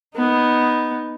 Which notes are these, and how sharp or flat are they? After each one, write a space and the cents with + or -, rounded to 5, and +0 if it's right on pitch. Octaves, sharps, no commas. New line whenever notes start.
B3 +0 D#4 +0